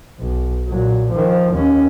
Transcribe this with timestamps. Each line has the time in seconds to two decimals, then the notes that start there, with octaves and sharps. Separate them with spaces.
0.20 B1
0.68 A#2 F#3
1.11 D#3 F3
1.54 D#2 C#4